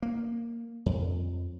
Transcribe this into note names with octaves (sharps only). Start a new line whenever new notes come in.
A#3
F2